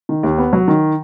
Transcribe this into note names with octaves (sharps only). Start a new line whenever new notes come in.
D#3
D#2
B3
F#3
D#3